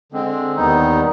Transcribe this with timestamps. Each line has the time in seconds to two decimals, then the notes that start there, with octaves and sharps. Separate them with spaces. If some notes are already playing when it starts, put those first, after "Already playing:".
0.12 D3 G#3 C4
0.56 D#2 D#3 G3 B3 D#4